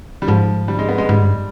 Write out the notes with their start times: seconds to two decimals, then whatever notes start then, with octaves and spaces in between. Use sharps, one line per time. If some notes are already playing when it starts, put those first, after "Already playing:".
0.22 G3
0.28 G#2 F3
0.68 G3
0.79 G#3
0.89 B3
0.98 G#3
1.09 G#2 G3
1.21 G2